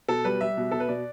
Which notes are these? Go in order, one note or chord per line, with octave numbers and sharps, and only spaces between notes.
B2 A4
G3 B4
G3 E5
B2
B2 A4
B4
B2 D5